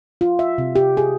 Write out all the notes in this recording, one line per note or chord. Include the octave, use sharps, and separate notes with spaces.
F4
E5
C3
G4
G#4